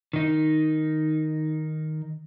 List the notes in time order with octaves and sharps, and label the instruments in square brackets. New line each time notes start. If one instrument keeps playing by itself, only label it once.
[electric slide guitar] D#3 D#4